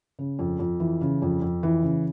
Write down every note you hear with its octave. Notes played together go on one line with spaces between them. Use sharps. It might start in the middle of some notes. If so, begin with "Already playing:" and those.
C#3
F2
F2
E3
C#3
F2
F2
E3
C#3